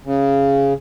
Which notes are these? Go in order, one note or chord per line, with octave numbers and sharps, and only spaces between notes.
C#3